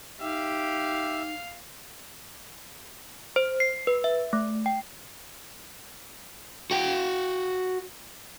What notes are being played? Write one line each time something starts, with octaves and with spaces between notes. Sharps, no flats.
D#4 G4 E5 F5
C5
C7
B4
E5
A3
G5
F#4 G5